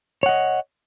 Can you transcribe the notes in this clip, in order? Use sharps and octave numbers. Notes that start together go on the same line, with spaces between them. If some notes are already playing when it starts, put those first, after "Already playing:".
C#5 D#5 F#5